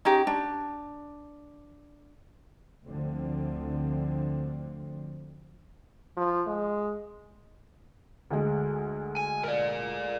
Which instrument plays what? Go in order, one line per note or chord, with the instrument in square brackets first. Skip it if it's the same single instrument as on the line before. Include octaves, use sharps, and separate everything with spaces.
[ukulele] C#4 D#4 G4
D4
[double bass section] D2 D3 F3 C4
[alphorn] F3
G#3
[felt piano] D2 G#3
[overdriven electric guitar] G#5
A#4 D5